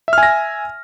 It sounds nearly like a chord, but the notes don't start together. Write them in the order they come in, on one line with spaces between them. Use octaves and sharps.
E5 F6 G#5 A#6